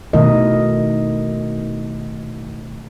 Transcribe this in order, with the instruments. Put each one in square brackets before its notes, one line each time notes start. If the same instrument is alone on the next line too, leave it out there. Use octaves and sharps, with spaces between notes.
[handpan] B2 D#3 A3 E4 A#4 D#5